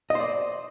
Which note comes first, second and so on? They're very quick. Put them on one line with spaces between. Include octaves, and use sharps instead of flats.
D#5 C5 D5